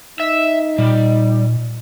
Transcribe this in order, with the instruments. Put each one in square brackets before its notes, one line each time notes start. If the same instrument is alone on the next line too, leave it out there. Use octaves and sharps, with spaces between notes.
[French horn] D#4 [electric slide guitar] E5
[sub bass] A#2 [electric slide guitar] G3